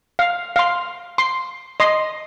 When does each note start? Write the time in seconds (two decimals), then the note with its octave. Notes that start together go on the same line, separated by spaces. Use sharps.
0.19 F5
0.56 F5 C6
1.18 C6
1.80 D#5 C6